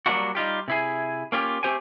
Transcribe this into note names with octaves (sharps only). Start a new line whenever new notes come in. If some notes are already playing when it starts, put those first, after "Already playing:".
F#3 G3 A#3 D4 E4 F#4
G3 D#4 F4 G4
C3 E4 G#4
A#3 C#4 F4 G4
A3 C4 G4 C5 G5 G#5